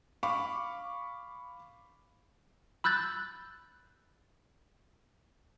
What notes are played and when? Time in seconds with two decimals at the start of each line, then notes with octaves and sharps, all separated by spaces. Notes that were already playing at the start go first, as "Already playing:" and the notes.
0.23 F5 B5 C#6 D6
2.84 B5 E6 F#6 G6 A6